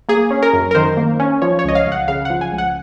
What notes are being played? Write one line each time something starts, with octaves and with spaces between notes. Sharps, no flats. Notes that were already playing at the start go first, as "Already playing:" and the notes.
A#3 G#4
C#4
A#4
F#2
A#4
D#3 C5
A#3
C#4
F3 C#5
C#5
C#2 D#5
F5
C#2
F#5
C#3 F5
F3 F#5
G#5
C#2
F#5